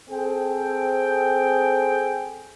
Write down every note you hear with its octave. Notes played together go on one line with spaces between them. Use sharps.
C4 G#4 A4 G5